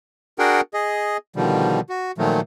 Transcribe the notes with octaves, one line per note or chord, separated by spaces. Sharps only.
D4 F#4 G#4 A#4 F#5 G5
G#4 D#5
B2 D3 D#3 F3 G3
F#4
A#2 D#3 F3 F#3 A3